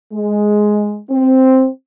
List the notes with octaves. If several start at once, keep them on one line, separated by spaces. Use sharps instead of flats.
G#3
C4